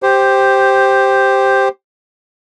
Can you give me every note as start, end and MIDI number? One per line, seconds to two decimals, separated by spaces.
0.03 1.69 67
0.03 1.69 72